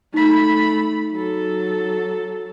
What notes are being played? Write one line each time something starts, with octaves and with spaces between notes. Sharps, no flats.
A3 D#4 B5 B6
F#3 A4